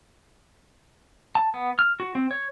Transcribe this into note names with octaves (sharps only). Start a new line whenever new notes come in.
A5
B3
F6
F#4
C4
C#5